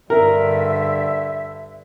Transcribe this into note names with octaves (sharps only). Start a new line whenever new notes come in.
G2 D3 A#4 E5